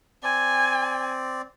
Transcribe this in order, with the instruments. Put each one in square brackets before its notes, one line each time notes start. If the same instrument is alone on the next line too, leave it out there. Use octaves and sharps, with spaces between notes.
[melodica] C4 D5 [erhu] G#5